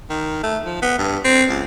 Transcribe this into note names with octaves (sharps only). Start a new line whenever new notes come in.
D#3
A3
F3
B3
G2
C4
C#2